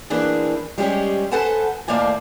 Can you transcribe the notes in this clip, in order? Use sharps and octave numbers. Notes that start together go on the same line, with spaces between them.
E3 A#3 C4 D4 G#4
G3 G#3 C4 C#4 G4 G#4
A4 B4 C5 F#5 G#5 A5
D#2 A2 A#3 C5 D5 G#5